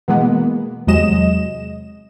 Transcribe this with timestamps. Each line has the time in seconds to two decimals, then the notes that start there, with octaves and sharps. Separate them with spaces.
0.08 B2 E3 G#3 A#3 B3
0.87 E2 C3 F#3 G#3 D#5 E7